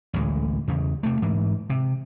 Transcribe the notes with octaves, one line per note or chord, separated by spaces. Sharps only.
A1 D2 A#2 G#3
E2 C#3
C3 A3
G#2 E3
C3